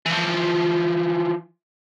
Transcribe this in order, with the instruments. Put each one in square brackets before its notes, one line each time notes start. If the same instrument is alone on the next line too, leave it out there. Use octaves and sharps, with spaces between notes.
[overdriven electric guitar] E3 F3